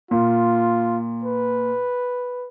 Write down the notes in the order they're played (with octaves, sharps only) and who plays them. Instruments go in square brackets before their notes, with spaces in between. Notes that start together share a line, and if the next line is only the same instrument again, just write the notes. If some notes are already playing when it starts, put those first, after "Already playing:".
[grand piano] A#2 [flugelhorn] F4
[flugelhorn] B4